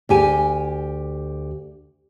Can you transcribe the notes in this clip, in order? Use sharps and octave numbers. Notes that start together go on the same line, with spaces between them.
D2 G4 G#5